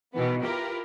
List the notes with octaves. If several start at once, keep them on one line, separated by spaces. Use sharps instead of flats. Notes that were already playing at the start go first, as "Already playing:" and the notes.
B2 D#3 E3 B3
E4 F4 G4 A#4 B4